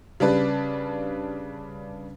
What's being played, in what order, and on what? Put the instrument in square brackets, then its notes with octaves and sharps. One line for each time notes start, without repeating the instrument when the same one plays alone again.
[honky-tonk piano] C#3 G3 D4 B4